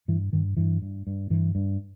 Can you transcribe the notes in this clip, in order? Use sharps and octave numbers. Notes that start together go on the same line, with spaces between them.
G2 E3
G2 D#3
G2 E3
G2
G2
G2 E3
G2